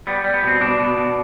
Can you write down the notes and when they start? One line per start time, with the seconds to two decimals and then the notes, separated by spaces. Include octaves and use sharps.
0.07 G3 B3
0.24 G3
0.34 B3
0.43 B2 C4
0.60 B2 D4
0.79 B2
0.97 B2